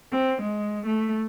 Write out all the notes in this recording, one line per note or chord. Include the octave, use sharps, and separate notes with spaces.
C4
G#3
A3